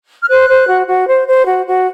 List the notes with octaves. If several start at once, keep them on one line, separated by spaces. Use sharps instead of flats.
F6
C5 F#6
C5
F#4
F#4
C5
C5
F#4
F#4